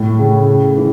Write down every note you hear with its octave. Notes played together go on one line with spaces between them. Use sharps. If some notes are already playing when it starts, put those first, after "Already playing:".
Already playing: A2
C#3
E3